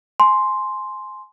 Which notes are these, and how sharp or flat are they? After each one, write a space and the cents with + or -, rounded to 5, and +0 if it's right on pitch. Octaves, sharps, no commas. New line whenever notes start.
G#5 +25 C6 +0